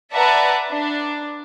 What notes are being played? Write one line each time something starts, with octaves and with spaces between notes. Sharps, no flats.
B4 D5 E5 F#5 A5 A#5
D4